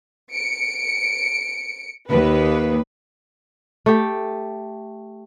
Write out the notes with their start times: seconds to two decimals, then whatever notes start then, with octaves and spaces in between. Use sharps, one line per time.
0.32 C#7 D7
2.09 D#2 B4
3.86 A3 G4